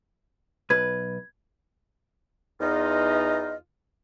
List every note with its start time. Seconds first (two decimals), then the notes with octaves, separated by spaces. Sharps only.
0.70 B1 B4 G#6
2.61 E2 D#4 F4 D#5